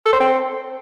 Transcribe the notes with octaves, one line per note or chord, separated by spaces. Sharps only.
A4
C5
C4